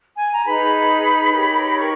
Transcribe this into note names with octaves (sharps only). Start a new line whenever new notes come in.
G#5
A#5
D#4 G#4 B4 B5
D#4 G4 A#4 C#5
C#6